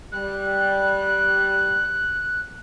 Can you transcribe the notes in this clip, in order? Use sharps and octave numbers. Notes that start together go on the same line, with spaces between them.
G3 F#6